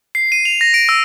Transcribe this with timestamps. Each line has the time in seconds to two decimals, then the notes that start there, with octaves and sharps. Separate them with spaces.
0.15 C7
0.32 D#7
0.45 F7
0.61 A#6
0.74 D7
0.89 E6